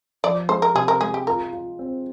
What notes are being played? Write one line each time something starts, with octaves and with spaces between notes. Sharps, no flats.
F3 D5
G#3 C5
A#4
C3 G#4
A#4
G#3 G#4
G4
F4 A#4
F4
C4